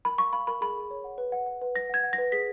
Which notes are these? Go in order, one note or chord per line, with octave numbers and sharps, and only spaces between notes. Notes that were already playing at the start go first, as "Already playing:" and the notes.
A#4 B5
F5 C#6
F5 B5
A#4 B5
G#4 B5
G#4
C#5
F#5
B4
F#5
F#5
B4
B4 A#6
F#5 G#6
F#5
A#6
B4
G#4 B6